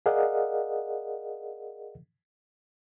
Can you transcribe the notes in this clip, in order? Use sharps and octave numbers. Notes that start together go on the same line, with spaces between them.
G#4 A#4 D5 D#5 F5 F#5